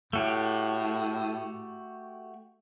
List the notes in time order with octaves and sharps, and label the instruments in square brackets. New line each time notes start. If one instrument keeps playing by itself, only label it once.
[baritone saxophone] A2 [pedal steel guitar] A3 F#4 G4